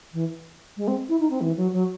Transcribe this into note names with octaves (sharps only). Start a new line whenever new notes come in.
E3
G#3
C4
E4
D#4
C4
E3
F#3
F#3